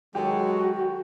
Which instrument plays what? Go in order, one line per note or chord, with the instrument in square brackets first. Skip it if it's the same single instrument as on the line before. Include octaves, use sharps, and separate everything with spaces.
[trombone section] D#3 F#3 [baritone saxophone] G#3 [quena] F#4 [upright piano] G4 A4